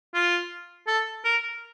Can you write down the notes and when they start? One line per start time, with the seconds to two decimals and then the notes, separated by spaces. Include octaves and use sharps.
0.14 F4
0.88 A4
1.25 A#4